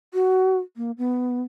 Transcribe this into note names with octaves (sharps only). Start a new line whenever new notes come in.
F#4
A#3
B3